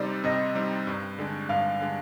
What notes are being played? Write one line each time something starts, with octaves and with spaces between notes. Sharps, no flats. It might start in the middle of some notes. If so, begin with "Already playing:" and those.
Already playing: C3 G3 C4 D#4 D5
C3 D#5
G3 C4 D#4
G2
D3 G#3 D4
G2 F5
D3 G#3 D4